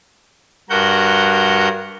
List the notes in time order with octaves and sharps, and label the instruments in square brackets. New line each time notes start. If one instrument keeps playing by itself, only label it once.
[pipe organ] G2 F#4 A#4 F#5 G6